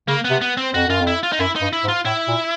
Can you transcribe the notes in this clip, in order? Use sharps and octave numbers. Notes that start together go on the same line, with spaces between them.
C#3 A#3
B3
C3
B3
C4
F2 F#4
F#2 F4
F2
E4
F4
D#4
F#2 E4
D#4
G2
E4
G#2
F4
A2 E4
A#2